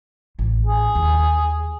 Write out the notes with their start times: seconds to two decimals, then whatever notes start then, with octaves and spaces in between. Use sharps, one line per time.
0.39 A1
0.66 G#4
0.95 D#2 D#3